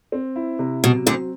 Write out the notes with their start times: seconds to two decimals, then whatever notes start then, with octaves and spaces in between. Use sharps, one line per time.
0.12 C4
0.36 E4
0.59 C3
0.83 B2 F#3
1.06 D2 D3 C4